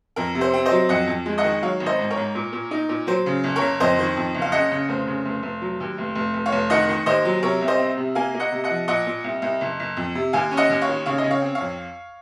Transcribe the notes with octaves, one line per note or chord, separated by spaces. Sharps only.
F2 A#4
C3
C5
C4
C5 D#5
F#3
F2 D#5 F#5
F2
G#3
D#5 F#5
D#3
F#3 C#5 F5
G#1
C5 D#5
G#2
A#4 C#5
G#2
A#2
A#2
D#4
A#2
F#3 C5
C#3
F#1
A#4 C#5
F#1
F2 C5 D#5
D#3
F2
F#1
F5
C#3 D#5 F#5
C#3
F1 C5
C#3
F1
F1
F#3
D#2
F1
F1
F1
C#5 F5
F1
D#3 D#5 F#5
D#3
D#2 C5 D#5
F#3
C3 A#4 C#5
C2
C5 D#5
C4
C3
A#3 F5 G#5
A#3
D#5 F#5
C3
D#5 F#5
F3
A#2 D#5 F#5
A#2
C2
C2
F#1
F#1
F2
C3
D#2 F5 G#5
C#4
D#5 F#5
D#2
C#5 F5
D#3
C#3 C#5 F5
D#5
C#3
C#5 F5
C4
C#5 F5
F2